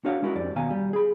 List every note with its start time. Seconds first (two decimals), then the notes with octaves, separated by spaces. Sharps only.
0.04 D4 F#4 A#4 C#5 F5 F#5
0.22 G#3 C#4 E4 F#4 A#4
0.36 F2 G4 D5
0.56 D#2 B2 D#3 F5 G#5 A#5
0.70 G3
0.93 G#4 B5